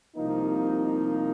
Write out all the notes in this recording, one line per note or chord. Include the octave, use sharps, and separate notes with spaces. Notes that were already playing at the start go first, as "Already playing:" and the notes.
C2 C3 F3 A#3 D#4